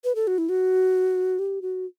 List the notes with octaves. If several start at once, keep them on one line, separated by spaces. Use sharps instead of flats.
B4
A4
F#4
E4
F#4
G4
F#4